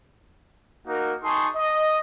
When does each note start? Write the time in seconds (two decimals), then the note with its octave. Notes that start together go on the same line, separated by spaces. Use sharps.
0.87 A#3 D#4 F#4 A#4
1.24 D#4 G#4 A5 C6 C#6
1.55 D#5